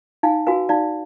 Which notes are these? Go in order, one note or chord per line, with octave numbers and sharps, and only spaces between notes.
D#4 F5 G#5
F#4 B4 F5 G#5
D#4 D5 F5